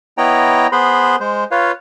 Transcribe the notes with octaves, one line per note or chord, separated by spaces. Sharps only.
B3 E4 C#5 D#5 G5 A#5
B3 G#4 B4 C5 B5 C6
G#3 C5
F4 B4 C#5 F5